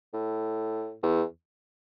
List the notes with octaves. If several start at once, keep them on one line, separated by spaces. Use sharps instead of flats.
A2
E2